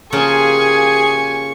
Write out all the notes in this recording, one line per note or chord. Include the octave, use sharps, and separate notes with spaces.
C#3 F3 A#3 G4 G#4 G#5 C#6